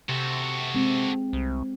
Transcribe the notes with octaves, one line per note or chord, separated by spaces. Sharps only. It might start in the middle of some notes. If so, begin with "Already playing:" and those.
C3 F#4 A4
G#3 C4
C2